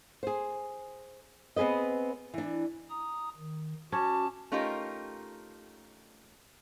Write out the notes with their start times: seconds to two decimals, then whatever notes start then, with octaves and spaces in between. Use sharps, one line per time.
0.23 G#4 C5
1.56 B3 C4 G#4 B4 D#5
2.34 E3 D4
2.90 A#5 D#6
3.38 D#3
3.92 C#4 F#4 A5 D6
4.52 A3 C#4 D#4 F4 G4 A#4